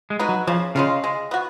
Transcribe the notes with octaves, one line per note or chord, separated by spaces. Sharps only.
G#3
B3 D#4 F#4
F#3
C#3 F3
C#3 G#3 C#4 F4
G#3
B3 F#4